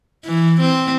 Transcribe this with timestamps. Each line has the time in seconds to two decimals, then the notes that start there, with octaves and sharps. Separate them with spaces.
0.25 E3
0.61 C4